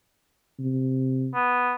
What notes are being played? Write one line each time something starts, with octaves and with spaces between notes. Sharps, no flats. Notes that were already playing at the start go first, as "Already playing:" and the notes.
C3
B3